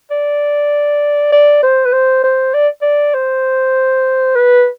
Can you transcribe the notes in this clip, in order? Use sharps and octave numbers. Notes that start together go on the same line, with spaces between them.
D5
D5
C5
B4
C5
C5
D5
D5
C5
B4